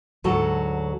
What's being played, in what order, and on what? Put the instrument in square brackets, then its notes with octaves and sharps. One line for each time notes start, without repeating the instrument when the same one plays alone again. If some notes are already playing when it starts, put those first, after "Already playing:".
[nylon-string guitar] D2 G#2 F#3 F#4 A4